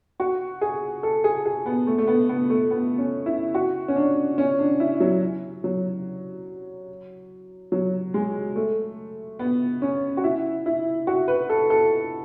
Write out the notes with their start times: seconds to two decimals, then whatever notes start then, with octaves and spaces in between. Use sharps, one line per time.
0.20 F#4
0.61 G#4
1.03 A4
1.24 G#4
1.45 G#4
1.66 B3
1.87 A3
1.98 A3
2.07 B3
2.29 B3
2.50 A3
2.71 B3
2.98 C#4
3.26 E4
3.54 F#4
3.88 C#4
3.96 D4
4.38 C#4
4.59 D4
4.80 E4
5.00 F#3
5.64 F#3
7.72 F#3
8.14 G#3
8.56 A3
9.39 B3
9.82 C#4
10.17 F#4
10.24 E4
10.66 E4
11.07 F#4
11.28 B4
11.49 A4
11.70 A4